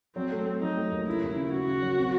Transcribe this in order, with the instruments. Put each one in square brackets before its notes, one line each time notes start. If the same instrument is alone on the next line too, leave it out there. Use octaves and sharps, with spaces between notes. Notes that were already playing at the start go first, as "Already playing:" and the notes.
[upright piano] F#3 [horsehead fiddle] C4
[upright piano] A3
A3
[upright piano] F#3 [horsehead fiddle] D#4
[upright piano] A3
D#2
[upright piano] C#3 [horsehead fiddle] E4
[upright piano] D#2
C#3
[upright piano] C#3 [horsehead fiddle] F#4
[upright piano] C#3
F#3
C4